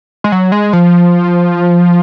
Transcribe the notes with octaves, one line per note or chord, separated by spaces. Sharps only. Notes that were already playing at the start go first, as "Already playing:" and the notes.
G#3
F#3
G#3
F3